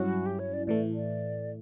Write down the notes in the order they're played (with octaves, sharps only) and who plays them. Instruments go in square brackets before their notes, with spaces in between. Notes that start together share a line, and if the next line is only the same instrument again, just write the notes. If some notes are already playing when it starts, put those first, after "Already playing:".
Already playing: [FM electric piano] G2 F#3 C#4 E4 [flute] F#4
[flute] G4
C#5
D5
[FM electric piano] A2 E3 A3 [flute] D5
[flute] D5